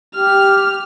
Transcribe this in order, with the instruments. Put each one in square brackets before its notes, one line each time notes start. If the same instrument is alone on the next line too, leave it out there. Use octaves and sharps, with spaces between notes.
[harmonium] G4 [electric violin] F6